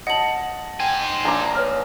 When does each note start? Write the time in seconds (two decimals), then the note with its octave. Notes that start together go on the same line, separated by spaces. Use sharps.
0.07 D#5 F#5 A5 F#7
0.80 C5 G5 G#5
1.25 A#1 A#5 D6
1.55 B4 C#5 F6